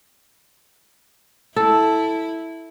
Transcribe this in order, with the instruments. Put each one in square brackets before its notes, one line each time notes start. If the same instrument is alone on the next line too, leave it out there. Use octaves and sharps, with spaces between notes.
[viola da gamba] E4 [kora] A4